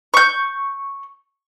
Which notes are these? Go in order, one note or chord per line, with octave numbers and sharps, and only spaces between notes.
C#6 G6